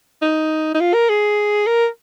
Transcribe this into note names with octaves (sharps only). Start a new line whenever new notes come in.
D#4
D#4
F4
A#4
G#4
A#4